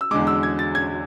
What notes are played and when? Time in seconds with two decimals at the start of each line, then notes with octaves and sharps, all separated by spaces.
0.01 E6
0.11 E2 D3 G#3 D6
0.27 E6
0.43 G#6
0.59 A6
0.75 G#6